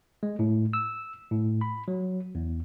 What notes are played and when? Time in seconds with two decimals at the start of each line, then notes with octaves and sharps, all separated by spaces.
0.23 G#3
0.39 A2
0.73 E6
1.31 A2
1.61 B5
1.88 F#3
2.35 E2